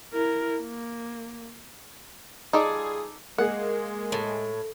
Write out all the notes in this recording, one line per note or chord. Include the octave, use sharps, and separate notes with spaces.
E4 A#4
A#3
G3 D#4 F4 G#4 A4 D5
G#3 A#3 G#4 F#5
A2